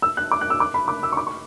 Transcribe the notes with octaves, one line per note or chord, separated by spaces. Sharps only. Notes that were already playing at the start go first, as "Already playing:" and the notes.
E6
F#6
D6
F#6
E6
D6
B5
D6
E6
C#6
D6
C#6